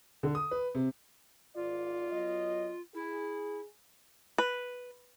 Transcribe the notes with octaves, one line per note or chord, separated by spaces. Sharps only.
D3
D#6
B4
C3
G#1 F4 D5
F#3 B3 D#5
E4 G#4
B4